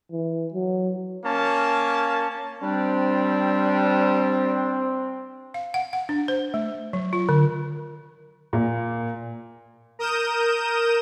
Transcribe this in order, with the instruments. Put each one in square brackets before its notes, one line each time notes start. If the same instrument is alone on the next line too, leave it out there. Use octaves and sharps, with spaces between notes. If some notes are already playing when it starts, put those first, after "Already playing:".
[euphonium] E3
F#3
[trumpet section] A#3 C#4 A5
[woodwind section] G3 D4 [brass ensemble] C4
[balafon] F5
F#5
F#5
D4
C5
A3
F#3
F4
D3
[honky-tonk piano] A#2
[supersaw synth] A#4 D#6 G6 E7